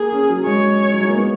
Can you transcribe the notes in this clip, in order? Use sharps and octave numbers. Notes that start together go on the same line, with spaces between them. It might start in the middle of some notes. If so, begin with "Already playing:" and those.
Already playing: A#3 G#4
C#4
F#3
G#3 C#5
F#3
G#3
A#3
B3